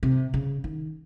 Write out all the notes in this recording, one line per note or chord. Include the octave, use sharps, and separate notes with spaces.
C3
C#3
D#3